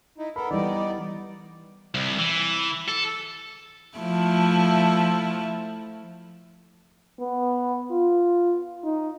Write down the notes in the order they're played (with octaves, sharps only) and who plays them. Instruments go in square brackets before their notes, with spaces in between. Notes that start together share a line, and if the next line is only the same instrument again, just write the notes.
[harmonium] D#4 E4
[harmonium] B3 A4 A#4 [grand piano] B5
[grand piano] E3 G3 [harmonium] B3 D#4 D5
[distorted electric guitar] C2
E3
A4
[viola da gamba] F3 A3 E4
[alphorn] B3
F4
D#4